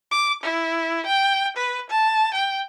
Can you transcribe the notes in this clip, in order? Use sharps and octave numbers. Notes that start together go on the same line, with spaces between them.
D6
E4
G5
B4
A5
G5